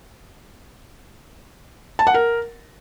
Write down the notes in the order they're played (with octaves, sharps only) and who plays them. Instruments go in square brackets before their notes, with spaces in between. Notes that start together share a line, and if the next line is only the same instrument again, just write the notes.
[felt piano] A5
F#5
A#4